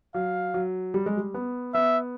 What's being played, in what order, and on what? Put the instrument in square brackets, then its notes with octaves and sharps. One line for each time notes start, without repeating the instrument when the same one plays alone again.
[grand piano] F#3 [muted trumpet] F5
[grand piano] F#3
G3
G#3
G3
B3
[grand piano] B3 [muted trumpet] E5